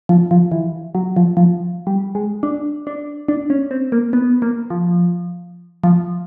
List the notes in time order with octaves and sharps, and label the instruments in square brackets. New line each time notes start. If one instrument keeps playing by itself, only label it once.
[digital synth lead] F3
F3
E3
F#3
F3
F3
G3
G#3
D4
D4
D4
C#4
C4
A#3
B3
A#3
F3
F3